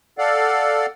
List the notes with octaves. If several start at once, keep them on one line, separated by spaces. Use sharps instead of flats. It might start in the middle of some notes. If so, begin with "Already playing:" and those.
A4 D5 F5 F#5